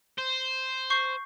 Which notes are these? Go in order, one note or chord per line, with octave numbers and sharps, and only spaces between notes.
C5
C#6 G6 C7